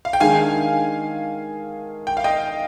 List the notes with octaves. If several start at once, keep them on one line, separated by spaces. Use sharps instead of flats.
F5
G5
D#3 G#3 D4 G#4 F5 G#5
G5
F5
D#5 G5